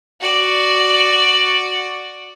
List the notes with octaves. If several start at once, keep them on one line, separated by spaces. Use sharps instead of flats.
F#4 D5